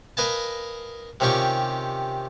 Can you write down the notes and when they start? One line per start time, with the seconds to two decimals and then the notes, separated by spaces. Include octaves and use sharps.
0.17 A#4 B4 D#5 F5 G#5 A5
1.20 C3 D#3 C#4 F4 G4 C#6